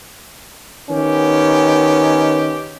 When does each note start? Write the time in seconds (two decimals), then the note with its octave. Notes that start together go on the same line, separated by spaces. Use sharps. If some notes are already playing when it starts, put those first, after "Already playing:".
0.89 D#3 B3 C#4 G4